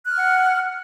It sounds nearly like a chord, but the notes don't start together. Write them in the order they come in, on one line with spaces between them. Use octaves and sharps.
F#6 F6 G#6 F#5